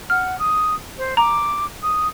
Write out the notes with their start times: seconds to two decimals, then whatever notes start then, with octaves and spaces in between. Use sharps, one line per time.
0.10 F#5 F6
0.39 D#6
0.98 C5
1.17 A#5 D6
1.82 D#6